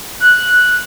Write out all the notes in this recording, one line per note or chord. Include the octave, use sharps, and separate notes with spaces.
F#6